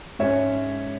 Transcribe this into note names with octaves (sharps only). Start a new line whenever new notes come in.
G#2 G#3 C#4 C#5 E5